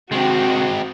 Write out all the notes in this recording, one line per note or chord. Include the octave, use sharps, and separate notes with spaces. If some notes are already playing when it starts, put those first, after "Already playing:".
C3 D#3 G#3 C4 F#4